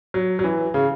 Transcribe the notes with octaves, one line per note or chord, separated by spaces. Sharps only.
F#3
F#3
E3
C#3